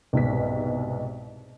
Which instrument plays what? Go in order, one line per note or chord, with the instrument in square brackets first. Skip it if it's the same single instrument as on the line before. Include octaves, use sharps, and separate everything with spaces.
[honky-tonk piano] C2 G#2 B2 B6